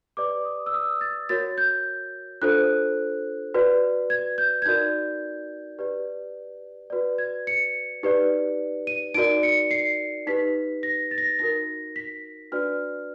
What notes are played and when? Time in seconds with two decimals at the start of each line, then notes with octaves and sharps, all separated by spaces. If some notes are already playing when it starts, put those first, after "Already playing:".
0.17 G4 B4 D5 D6
0.45 D#6
0.66 E6
0.74 D#6
1.01 A6
1.29 F#4 A#4 C#5 A6
1.58 G6
2.42 D4 F4 A4 C5 F#6
3.54 F#4 B4 D5
4.10 G#6
4.38 G6
4.62 G#6
4.66 D#4 F#4 A#4 D5 G6
5.79 G4 B4 D5
6.90 F#4 B4 D5
7.18 G#6
7.47 C#7
8.03 D#4 G4 B4 D5
8.87 D#7
9.14 D#4 F#4 A#4 D5 D7
9.43 C#7
9.71 C7
10.27 D#4 G4 B4 B6
10.83 A#6
11.11 A6
11.18 A#6
11.26 A6
11.39 D#4 F#4 A#4 A#6
11.96 B6
12.52 D4 F#4 B4 D5 F6